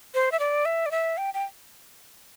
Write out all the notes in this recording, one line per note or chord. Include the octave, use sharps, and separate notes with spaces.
C5
E5
D5
E5
D5
E5
G5
G5